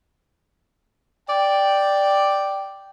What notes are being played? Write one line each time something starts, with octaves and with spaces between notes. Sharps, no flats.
D5 G5